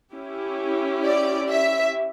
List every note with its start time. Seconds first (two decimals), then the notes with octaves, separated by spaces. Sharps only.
0.14 C#4 E4 G4
1.05 D5
1.51 E5